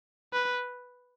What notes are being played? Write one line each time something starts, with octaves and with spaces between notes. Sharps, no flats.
B4